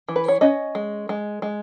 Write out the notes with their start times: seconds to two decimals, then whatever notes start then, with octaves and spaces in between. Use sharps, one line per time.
0.09 E3
0.16 B4
0.28 C#5
0.41 C#4 D#5
0.75 G#3
1.09 G#3
1.42 G#3